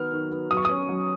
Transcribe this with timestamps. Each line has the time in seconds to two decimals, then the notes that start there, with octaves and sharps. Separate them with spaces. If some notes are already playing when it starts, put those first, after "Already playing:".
Already playing: D#3 F#3 B3 F6
0.12 D#3
0.31 B3
0.51 F#3 D#6
0.57 C#6
0.65 C#4 D#6
0.89 F#3